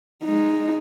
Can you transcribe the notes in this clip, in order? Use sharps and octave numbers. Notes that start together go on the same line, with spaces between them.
G#3 D#4